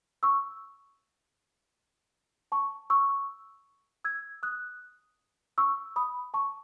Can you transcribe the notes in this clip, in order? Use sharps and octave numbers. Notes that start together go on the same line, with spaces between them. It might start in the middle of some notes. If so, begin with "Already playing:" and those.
C#6 E6
A5 C#6
C#6 E6
E6 G#6
D#6 F#6
C#6 E6
B5 D#6
A5 C#6